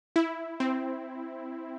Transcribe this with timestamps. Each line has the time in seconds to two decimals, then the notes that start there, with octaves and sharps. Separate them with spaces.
0.16 E4
0.60 C4